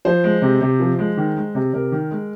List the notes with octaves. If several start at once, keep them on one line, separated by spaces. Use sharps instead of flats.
F3 C5
G#3
C3
C3
F3
G#3
D#3
G#3
C3
C3 A#4
D#3
G#3